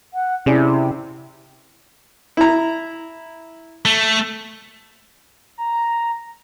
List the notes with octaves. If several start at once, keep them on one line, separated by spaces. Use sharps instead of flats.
F#5
C3 C#4 E4 G#4 D5
E4 A#5
A3
A#5